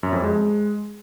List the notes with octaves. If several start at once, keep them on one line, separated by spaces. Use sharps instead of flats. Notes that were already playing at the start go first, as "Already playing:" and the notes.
F#2
F2
G#3